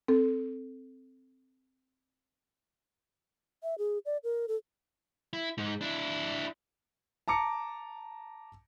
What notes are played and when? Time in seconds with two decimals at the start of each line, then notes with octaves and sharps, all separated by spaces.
0.08 C4 A4
3.63 E5
3.78 G#4
4.06 D5
4.24 A#4
4.48 A4
5.33 E4
5.58 G#2
5.81 D4 E4
7.28 A5 A#5 D6 C#7